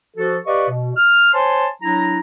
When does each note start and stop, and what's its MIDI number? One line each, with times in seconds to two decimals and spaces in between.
0.17 0.37 53
0.17 0.37 66
0.17 0.37 69
0.46 0.68 67
0.46 0.68 71
0.46 0.68 74
0.46 0.68 75
0.46 0.68 77
0.46 0.68 85
0.69 0.91 47
0.97 1.30 89
1.33 1.66 72
1.33 1.66 73
1.33 1.66 80
1.33 1.66 81
1.33 1.66 84
1.82 2.20 54
1.82 2.20 62
1.82 2.20 64
1.82 2.20 82